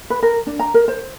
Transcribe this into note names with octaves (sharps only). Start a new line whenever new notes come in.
B4
A#4
D4
A#5
A#4
C5